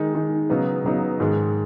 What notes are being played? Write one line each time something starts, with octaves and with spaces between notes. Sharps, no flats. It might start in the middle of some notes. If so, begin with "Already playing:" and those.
Already playing: D#3 G#3 D#4
D#3 G#3 D#4
C#3 F#3 B3 D#4
C#3 F#3 B3 D#4
G#2 D#3 G#3